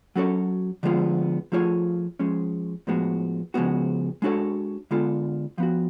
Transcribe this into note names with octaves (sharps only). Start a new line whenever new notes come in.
F#3 C#4 F#4 A4 C#5
D3 F3 G#3 B3 F4
F3 A3 F4 G#4 C#5
F3 G#3 C#4
A2 F3 G#3 B3 F#4
C#3 F3 G#3 B3 F#4
G#3 D4 F#4 A4 C#5
D3 G#3 B3 F4 A4
F3 B3 F#4